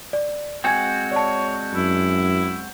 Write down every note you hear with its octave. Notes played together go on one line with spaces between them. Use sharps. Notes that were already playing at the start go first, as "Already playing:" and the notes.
D5
G#3 C4 F#4 G5 G#5 G#6
C#5 D5 A5
F#2 E4